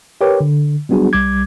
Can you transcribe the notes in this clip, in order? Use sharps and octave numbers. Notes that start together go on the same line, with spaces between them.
G4 A#4 B4 C#5 G5 D6
D3
F#3 G3 B3 D4 F#4 G#4
B1 G3 D6 G#6